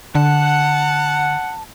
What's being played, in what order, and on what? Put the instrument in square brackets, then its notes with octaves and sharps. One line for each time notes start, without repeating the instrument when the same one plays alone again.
[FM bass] D3 [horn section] F#5 [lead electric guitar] A5